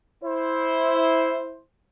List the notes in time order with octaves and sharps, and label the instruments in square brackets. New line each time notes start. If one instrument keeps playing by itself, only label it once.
[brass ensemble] E4 C5